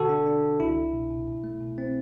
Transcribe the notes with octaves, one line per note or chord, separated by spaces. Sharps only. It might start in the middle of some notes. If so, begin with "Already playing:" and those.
Already playing: B2 D3 F#4 A4
D4
D4
D4
C2 E4
C2
B2
B2
B2
A3
B2
C4